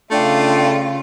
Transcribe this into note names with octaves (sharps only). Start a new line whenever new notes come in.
C#3 A3 D4 F4 F5 G5